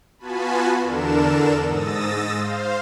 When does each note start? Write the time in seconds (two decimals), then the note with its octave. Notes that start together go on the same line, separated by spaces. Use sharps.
0.19 B3 F4 F#4 G#5 A5 B5
0.83 E2 D3 D4 A4 A#4 E7
1.64 G#2 D#6 E6 A6 A#6
2.33 C5 F5